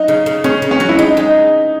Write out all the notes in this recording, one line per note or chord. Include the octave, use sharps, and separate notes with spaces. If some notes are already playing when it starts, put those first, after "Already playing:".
Already playing: F#3 D#4
C#3
C#3
C#3 C#4
C#3
C#4
F#3
E4
G#3 D#4
G#3 D#4